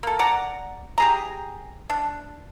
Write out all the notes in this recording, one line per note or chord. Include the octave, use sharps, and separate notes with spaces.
A#3 A4
D5 F#5 A#5
G4 G#4 A#5
D4